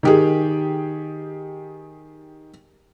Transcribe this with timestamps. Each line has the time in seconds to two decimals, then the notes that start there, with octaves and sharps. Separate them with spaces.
0.03 D#3 G4 G#4